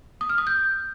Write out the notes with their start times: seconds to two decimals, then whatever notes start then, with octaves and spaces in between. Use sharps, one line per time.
0.21 D#6
0.29 F6
0.38 D#6
0.47 G6